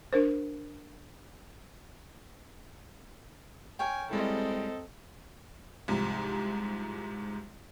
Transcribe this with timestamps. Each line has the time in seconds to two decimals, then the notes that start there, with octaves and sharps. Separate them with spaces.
0.13 D4 A#4 C5
3.79 A#4 C#5 G5 G#5
4.11 G3 G#3 C4 E4 A4 D#5
5.88 C2 G#2 C3 F3